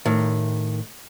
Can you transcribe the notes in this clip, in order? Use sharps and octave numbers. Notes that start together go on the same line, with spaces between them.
A2 D#3